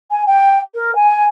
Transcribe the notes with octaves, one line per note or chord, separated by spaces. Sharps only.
G#5
G5
A#4
G#5